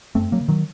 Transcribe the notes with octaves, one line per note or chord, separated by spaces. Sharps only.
F#2 A3 C4
F#3 A#3
C#3
D#3 F#3